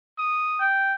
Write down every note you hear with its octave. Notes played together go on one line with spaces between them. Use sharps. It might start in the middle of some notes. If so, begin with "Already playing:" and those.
D#6
G5